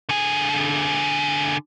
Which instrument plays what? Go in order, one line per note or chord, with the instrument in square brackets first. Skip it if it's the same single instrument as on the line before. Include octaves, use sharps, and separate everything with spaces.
[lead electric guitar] D3 G#4